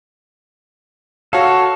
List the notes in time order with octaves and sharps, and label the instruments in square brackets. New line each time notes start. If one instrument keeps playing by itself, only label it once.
[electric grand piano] F#4 C#5 F5 [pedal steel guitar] A4